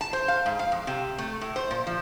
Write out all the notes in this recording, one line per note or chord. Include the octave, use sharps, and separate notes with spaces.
A5
C5
F5
G#2
F5
F2
C3
A3
A2
C5
A#2
F3